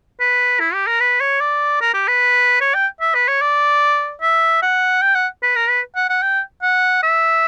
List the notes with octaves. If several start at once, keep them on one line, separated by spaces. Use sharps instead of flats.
B4
E4
G4
A#4
B4
C#5
D5
A#4
G4
B4
C#5
G5
E5
B4
C#5
D5
E5
F#5
G5
F#5
B4
A#4
B4
F#5
F#5
G5
F#5
E5